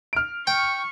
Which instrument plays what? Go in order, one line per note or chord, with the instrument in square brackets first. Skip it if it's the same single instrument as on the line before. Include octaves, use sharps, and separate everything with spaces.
[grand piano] F6 D7
[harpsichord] G5 [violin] C#6